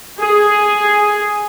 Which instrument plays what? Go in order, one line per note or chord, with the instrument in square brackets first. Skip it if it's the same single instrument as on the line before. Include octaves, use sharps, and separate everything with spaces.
[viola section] G#4